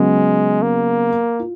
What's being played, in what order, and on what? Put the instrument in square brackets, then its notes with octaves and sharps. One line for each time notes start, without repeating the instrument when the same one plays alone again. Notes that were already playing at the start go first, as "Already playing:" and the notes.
Already playing: [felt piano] C#3 F#3 B3 [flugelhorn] G#3
[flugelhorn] A#3
[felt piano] F4